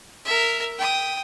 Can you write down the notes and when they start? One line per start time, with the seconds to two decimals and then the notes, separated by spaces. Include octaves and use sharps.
0.25 A#4 E5
0.78 G5 D#6